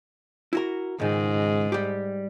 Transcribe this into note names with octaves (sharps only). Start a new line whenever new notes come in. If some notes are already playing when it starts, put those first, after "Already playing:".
E4 F#4 A#4
C#2 G#2 D#3
G3 G4